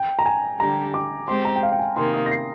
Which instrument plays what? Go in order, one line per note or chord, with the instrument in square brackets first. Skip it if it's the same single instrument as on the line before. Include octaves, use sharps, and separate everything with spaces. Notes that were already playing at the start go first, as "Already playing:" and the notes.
Already playing: [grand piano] G5
A#5
G#5
[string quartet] D3 G3 D4 G4 [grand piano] A#5
[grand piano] D6
[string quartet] G#3 C4 G4 C5 [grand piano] C6
[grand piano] A#5
G5
F5
G5
G#5
[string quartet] C3 D#3 A#3 [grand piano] C6
[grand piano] D#6
A#6
C7